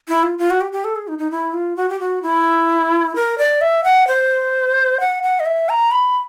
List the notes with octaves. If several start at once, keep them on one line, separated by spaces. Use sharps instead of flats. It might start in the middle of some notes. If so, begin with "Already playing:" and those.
E4
F4
F4
F#4
G4
G4
A4
G#4
D#4
D#4
E4
F4
F#4
G4
F#4
E4
A#4
D5
E5
F#5
C5
F#5
F#5
D#5
E5
A#5
B5